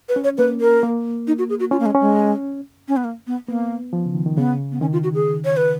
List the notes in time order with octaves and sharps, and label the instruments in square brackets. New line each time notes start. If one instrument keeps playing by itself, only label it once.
[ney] B4
[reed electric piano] C#4
[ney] C#5
[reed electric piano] A#3 [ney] B4
[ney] A#4
[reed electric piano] A#3
[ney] D#4
F#4
G#4
F#4
[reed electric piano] C#4 [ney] F4
[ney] A#3
G#3
[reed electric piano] C#4
[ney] G#3
C#4
B3
A#3
B3
[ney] A#3 [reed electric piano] B3
[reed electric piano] F3
C#3
D#3
D#3
[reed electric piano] C#3 [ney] B3
[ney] B3
[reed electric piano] D#3 [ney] C#4
[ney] F4
F#4
G#4
C#5
B4